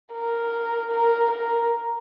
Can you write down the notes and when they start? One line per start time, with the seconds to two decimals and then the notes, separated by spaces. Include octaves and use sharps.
0.13 A#4
0.91 A#4
1.31 A#4